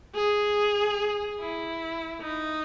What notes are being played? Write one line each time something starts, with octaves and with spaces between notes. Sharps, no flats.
G#4
E4
D#4